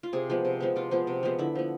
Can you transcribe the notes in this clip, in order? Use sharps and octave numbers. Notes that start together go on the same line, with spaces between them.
F4
C3 G#4
F3 G#3 B3
C3
F3 G#3 B3
C3 F4
F3 G#3 B3
C3
F3 G#3 B3
D3 E4
F3 B3